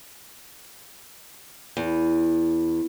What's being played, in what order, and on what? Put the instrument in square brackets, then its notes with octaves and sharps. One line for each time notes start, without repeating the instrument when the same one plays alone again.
[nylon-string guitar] E2